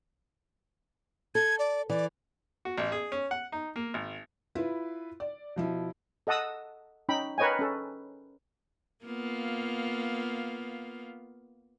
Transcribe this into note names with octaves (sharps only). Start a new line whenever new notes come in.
A4 G#6
D5
E3 D5
F#4
A1
G#4
C#4
F#5
D#4
A#3
G#1
E4 F4 B4
D5
B2 F3 E4
A4 D#5 F#5 A5 D#6 E6
C#4 D#4 G5 B5
A#4 B4 C#5 D#5 G5 G#5
C#4 A4
A#3 B3 F4